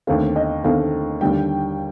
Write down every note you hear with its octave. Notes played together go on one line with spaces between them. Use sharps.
D#2 D3 A3 C4 F5
D#5
D#2 D3 A3 C4 F5
D#2 D3 G3 G5